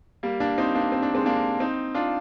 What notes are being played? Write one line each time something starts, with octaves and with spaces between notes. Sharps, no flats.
G3 A#3
A#3 D4
C4 D#4
A#3 D4
C4
D4
G#3 C4
A#3 D4
C4 D#4
D4 F4